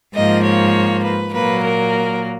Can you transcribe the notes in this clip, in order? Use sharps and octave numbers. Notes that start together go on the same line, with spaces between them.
G#2 F3 A#3 D#5
C#5
B4
A#2 F#3 A#3 B4
A#4